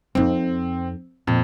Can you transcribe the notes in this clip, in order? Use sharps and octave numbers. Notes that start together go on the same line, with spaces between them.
F2 C4 D#4
F2 A#2